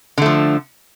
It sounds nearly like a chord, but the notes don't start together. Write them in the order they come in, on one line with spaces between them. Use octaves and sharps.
D3 A3 F3